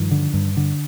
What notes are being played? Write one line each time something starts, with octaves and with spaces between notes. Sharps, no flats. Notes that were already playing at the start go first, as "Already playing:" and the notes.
Already playing: G2 D#3 F3
D3
G2
D3